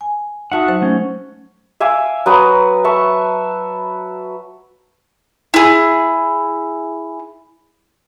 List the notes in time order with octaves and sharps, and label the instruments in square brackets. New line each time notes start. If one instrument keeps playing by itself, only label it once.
[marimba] G#5
[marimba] D#4 A5 D#6 [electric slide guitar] F#4 E5 F#5
[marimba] F#3 C5
[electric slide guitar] A3 C#4
[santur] E5 F5 G#5 D6
F#3 B4 A#5 D#6
E5 A5 C#6
[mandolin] E4 G#4